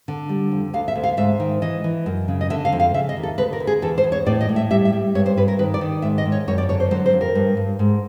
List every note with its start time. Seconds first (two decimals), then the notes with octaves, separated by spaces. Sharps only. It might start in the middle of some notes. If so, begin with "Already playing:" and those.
0.08 D3
0.29 G3
0.51 F2
0.73 D2 F5
0.88 E5
0.95 D2
1.04 F5
1.17 G#2 E5
1.40 D#3
1.62 E3 D#5
1.84 E3
2.06 F#2
2.28 C#3
2.41 D#5
2.50 D3 E5
2.65 F5
2.72 F2
2.80 F5
2.94 C#3 E5
3.09 D#5
3.17 D#2
3.23 A4
3.38 D2 B4
3.53 A#4
3.60 D2
3.67 G#4
3.82 E2 A4
3.98 C5
4.04 E2
4.12 C#5
4.26 A2 D5
4.41 D#5
4.49 A2
4.56 E5
4.70 G3 E5
4.85 E5
4.93 G3
5.15 G2 C#5
5.26 C5
5.37 G2 B4
5.48 A#4
5.59 D#3 B4
5.74 D5
5.81 D#3
6.02 G#2 E5
6.18 D#5
6.25 G#2
6.32 C#5
6.48 F#2 C#5
6.58 D5
6.69 D3 C#5
6.80 C5
6.91 F#3 C5
7.06 C5
7.13 F2
7.21 A#4
7.35 G2
7.57 G2
7.79 G#2